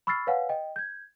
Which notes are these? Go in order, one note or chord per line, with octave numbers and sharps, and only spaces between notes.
B5 C#6 E6 F6 A6 C7
B4 C#5 F5 F#5 G#5
D#5 G5
G6 G#6